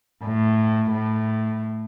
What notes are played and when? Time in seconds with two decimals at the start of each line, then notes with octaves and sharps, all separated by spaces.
0.23 A2
0.91 A2